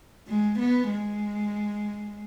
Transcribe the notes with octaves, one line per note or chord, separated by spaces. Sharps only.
G#3
B3
G#3